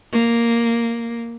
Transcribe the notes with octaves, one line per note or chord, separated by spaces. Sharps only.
A#3